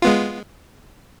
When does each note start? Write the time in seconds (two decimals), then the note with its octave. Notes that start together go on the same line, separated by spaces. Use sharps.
0.02 G#3 B3 F4